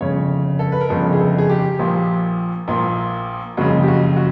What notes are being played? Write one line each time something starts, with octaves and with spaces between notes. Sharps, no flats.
G1 F2 C#3 C#5
A4
B4
A#4
G1 F2 C#3 A4
G#4
A4
G#4
G4
A#1 A#2 F3
A#1 A#2 F3
F#1 F2 C#3 F#4
G4
F#4
F#4